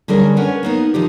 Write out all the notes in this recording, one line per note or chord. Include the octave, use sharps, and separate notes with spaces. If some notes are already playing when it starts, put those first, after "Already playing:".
D3 G3 C#4 G#4 A#4
C#4 A#4 B4 F#5
A#3 B3 D#4
D#3 F3 D#4 G4